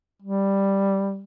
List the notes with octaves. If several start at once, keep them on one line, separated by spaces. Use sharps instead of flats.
G3